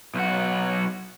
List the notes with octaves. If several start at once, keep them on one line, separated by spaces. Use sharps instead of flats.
B1 F#4